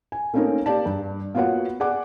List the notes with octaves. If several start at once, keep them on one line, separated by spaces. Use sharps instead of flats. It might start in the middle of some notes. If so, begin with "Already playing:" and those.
G#5
A3 A#3 C4 C#4 D#4 A#4
A#3 G4 D5 A5
G2
A#3 B3 F4 F#4 C#5 F#5
G#4 D5 F#5 D6